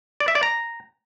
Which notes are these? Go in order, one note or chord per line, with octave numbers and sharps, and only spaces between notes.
D5
E5
D5
A#5